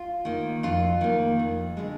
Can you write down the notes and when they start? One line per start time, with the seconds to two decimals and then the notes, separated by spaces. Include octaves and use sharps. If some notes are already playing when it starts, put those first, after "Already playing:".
Already playing: F4
0.25 D#3 A#3
0.63 F2 F4
1.01 D#3 A#3
1.39 F2
1.77 D3 G#3